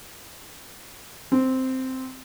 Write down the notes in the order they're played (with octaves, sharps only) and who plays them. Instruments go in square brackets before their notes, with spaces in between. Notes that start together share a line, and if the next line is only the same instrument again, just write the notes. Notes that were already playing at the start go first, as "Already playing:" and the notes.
[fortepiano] C4